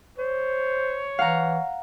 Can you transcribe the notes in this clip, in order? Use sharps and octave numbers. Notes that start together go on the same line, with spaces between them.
C5 C#5
E3 F5 F#5 A#5